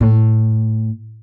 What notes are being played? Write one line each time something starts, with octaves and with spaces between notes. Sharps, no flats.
A2